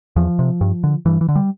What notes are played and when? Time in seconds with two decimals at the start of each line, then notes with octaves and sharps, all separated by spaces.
0.16 E2 F3
0.39 C3
0.61 G2
0.84 D3
1.06 G2 E3
1.21 E3
1.28 D3
1.35 G3